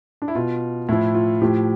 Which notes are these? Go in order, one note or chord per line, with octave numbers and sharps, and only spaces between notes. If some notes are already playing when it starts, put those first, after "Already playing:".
D4
E4
B2 F4
A2 F3 E4
F4
A2 F3 G4